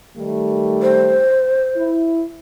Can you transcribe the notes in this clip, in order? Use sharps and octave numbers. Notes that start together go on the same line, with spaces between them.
D#3 G3 A3
C5
E4